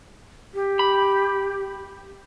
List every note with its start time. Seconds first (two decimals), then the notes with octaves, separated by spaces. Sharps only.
0.54 G4
0.79 B5